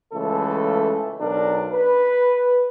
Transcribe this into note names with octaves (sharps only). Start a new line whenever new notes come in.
C#2 E3 A3 A4
B1 D4 A#4
B4